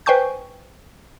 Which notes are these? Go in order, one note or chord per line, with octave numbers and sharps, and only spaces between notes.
B4 C5 G5 G#5 C#6 G6